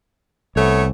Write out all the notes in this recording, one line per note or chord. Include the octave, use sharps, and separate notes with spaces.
C2 A3 B3 C#5